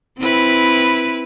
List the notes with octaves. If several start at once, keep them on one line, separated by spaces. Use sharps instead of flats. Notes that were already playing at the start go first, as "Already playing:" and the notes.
C4 E4 B4